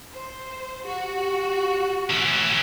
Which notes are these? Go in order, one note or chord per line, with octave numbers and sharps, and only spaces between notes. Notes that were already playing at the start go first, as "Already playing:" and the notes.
C5
F#4 G4
E3 C#4